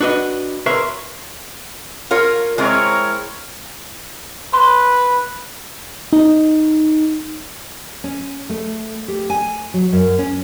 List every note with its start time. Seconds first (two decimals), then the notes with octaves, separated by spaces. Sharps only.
0.01 D4 F#4 B4 D#5
0.66 A#4 B4 C#5 E5 C6
2.11 F4 A#4 C#5
2.58 G#3 C4 E4 A#4 C#5
4.53 B4 C6
6.13 D#4
8.04 C#4
8.50 A3
9.08 G4
9.30 G#5
9.74 F#3
9.92 F#2
10.19 C#4